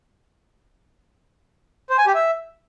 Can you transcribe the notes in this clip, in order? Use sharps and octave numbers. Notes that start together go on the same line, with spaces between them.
C5
G#5
G4
E5